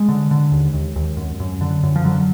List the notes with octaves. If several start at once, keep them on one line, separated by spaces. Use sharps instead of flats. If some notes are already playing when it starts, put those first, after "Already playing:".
Already playing: G#3
D3
D3
D#2
D#2
D#2
F#2
F#2
D3
F#2
F3
D3 F#3